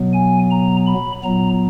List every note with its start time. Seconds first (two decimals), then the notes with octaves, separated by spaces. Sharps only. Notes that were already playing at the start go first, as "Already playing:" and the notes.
Already playing: B2 F#3 B3
0.14 G#5
0.51 A#5
0.87 B5
1.23 A#2 F#3 B3 A#5